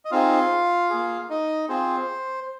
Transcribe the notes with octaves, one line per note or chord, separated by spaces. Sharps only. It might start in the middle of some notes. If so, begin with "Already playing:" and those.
D#5
C4 D#4 F4 G#4 F5
A#3 G#4
D#4 D#5
C4 F4 G#4 C5